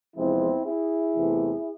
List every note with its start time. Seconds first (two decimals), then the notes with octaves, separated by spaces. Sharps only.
0.15 E2 C3 F3 G#3 C4 E4
0.65 E4 G#4
1.16 E2 C3 E3 A3